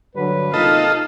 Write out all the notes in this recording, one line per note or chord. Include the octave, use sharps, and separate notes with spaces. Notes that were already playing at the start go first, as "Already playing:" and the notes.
G2 D3 F#3 B4
C3 A#3 D#4 F4 A4 D#5 F5